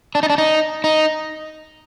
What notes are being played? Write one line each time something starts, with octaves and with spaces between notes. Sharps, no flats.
D4
D#4
D4
D#4
D#4